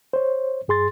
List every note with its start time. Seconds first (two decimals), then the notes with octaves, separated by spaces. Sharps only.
0.13 C5 C#5
0.68 G2 G#4 C6 A6